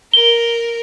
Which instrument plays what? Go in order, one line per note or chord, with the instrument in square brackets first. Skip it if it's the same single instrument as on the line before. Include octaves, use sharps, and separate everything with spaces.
[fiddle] A#4 [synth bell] G7